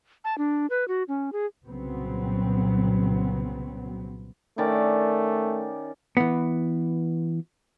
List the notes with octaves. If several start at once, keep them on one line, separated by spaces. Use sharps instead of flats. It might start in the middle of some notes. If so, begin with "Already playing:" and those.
A5
D4
B4
F#4
C#4
G#4
C2 A#2 C#3 F#3 B3 C4
D#3 A3 C#4 D5
E3 B3